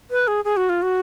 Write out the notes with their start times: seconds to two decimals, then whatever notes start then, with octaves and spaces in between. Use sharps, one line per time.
0.11 B4
0.28 G#4
0.45 G#4
0.57 F#4
0.69 F4
0.82 F#4